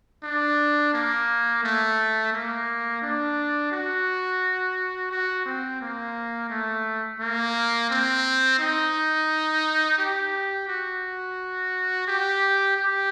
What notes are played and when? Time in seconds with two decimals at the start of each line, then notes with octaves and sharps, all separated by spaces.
0.23 D4
0.94 A#3
1.63 A3
2.33 A#3
3.02 D4
3.72 F#4
5.11 F#4
5.45 C4
5.81 A#3
6.50 A3
7.19 A#3
7.90 C4
8.59 D#4
9.98 G4
10.68 F#4
12.07 G4
12.77 G4